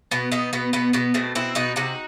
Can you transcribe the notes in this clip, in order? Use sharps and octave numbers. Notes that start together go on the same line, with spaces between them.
B2 B3
B2 B3 D#4
B2 B3
B2 B3
B2 B3
B2 A3 C4
B2 C4 E4
B2 D#4 F#4
C3 D#4 F#4